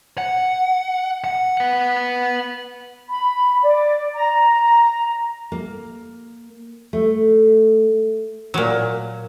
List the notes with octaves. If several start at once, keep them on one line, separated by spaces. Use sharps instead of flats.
F#5
F#5
B4 F#5
B5
D5
A#5
A#3
A3
A#2 F#3